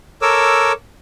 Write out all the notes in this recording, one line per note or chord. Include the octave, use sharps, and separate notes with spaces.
A4 A#4 C#5 D6 E6